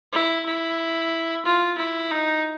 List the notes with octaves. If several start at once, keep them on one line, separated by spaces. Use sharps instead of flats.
E4
E4
F4
E4
D#4